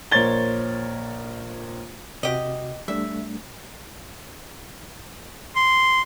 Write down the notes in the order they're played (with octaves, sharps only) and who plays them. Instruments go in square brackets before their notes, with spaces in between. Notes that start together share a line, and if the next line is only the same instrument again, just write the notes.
[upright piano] A#1 A#4 C5 C#5 A6 G7
[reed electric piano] C3 F#4 [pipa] G4 D#5
[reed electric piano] G3 A3 D4 [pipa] E5
[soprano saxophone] C6